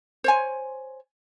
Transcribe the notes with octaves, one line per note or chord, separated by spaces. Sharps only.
C5 C#5 G#5